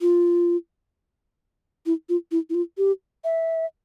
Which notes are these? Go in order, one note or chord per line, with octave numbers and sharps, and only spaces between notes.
F4
E4
F4
E4
E4
F4
G4
E5